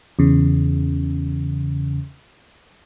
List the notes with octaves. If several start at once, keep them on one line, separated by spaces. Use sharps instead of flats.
E2 C#3